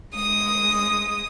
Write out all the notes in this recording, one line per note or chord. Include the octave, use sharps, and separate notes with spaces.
G#3 D#6